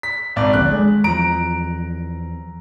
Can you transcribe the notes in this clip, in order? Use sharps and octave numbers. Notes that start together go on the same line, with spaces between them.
B6
G#1 D5
A#1 D#2 D3 F#6
G#3
E2 F3 A#5 D7